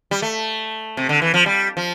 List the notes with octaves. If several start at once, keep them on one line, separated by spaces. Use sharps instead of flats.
G3
A3
C3
D3
E3
F3
G3
F3